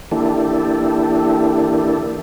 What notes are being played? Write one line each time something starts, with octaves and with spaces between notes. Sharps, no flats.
E3 A#3 D4 E4 G4 A4